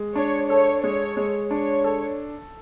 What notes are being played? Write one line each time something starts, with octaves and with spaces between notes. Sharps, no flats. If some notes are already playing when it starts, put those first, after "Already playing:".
Already playing: G#3
D4 C#5
A4 C#5
G#3 C#5
G#3
D4 C#5
A4